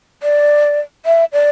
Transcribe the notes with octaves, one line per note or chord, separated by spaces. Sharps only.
D5
E5
D5